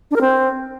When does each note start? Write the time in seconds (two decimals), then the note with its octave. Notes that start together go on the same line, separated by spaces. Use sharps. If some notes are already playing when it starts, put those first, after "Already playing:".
0.11 D4
0.16 A#4
0.21 C4